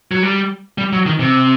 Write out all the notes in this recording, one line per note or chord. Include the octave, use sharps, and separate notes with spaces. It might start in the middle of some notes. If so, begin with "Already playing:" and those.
F#3
G3
G3
F#3
D#3
C3